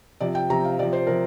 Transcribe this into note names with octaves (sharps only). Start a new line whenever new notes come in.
C3 F3 D5
G5
C3 F3 A#5
F5
C3 F3 D5
C5
C3 F3 A#4